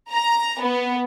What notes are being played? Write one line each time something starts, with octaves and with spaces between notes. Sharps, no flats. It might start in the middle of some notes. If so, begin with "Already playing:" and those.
A#5
B3